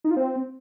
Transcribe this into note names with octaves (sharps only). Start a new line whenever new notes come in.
D#4
F4
C4